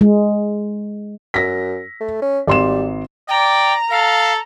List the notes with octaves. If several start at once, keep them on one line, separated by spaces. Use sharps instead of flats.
G#3
F#2 A#6 B6
A3
C#4
G#1 G3 C6 E7
D5 G5 A#5
A4 F5